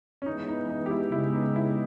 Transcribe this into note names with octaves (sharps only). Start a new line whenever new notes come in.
C#4
E3 G#3 B3 D#4
D#4
D#4
G4
E4
C#3 G#3 B3 E4
D#4
E4